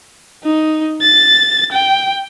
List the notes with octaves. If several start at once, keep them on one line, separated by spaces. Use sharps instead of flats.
D#4
A6
G5